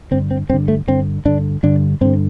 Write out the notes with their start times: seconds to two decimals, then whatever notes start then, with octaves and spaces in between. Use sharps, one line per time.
0.11 G2 D3 C4
0.31 C4
0.50 G2 C4
0.53 D3
0.68 A3
0.87 G2 D3 C4
1.25 G2 D3 D4
1.63 G2 D3 D4
2.01 G2 D3 C4